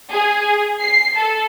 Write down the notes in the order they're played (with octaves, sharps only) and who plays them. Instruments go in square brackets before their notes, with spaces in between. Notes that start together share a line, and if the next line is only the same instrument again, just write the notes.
[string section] G#4
C7
A4